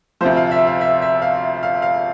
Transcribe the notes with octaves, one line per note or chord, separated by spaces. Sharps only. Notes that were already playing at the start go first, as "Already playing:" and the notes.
D2 C3 F3 C5
F5
E5
F5
E5
E5
F5
F5
F5